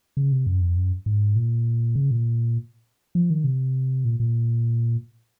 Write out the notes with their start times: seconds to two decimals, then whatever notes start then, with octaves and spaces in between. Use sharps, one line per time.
0.17 C#3
0.32 C3
0.47 F#2
0.61 F2
0.77 F#2
1.06 G#2
1.36 A#2
1.95 C#3
2.11 A#2
3.15 F3
3.30 D#3
3.44 C3
4.05 A#2
4.20 A#2